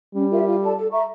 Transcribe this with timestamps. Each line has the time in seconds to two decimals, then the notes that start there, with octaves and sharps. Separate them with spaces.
0.15 G3 C#4
0.30 F4 A#4 E5
0.45 F4
0.62 A4 D5 A5
0.77 A4
0.92 E5 A#5 C#6